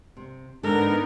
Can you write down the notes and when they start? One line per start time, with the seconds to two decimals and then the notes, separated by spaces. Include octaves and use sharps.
0.17 C3
0.63 G#2 D3 B3 D4 D#4 A4 A#4